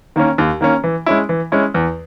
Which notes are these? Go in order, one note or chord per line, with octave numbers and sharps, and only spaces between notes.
D#3 A#3 C#4
D#2
D#3 A#3 C#4
E3
G#3 C#4 E4
E3
G#3 C#4 E4
E2